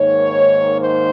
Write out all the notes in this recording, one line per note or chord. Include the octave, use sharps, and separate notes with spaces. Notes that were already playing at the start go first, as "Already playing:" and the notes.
Already playing: G#2 D#3 A#3 C#5
C5